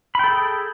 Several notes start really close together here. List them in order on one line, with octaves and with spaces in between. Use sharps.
B5 G5 A4 G#4